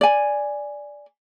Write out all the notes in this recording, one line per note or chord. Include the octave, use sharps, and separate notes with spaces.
D5 G#5